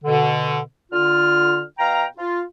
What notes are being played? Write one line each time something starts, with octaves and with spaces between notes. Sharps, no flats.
B2 D3
D3 F4 F6
B2 F5 G5 A#5
F4